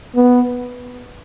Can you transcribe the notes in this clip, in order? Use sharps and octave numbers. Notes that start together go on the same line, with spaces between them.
B3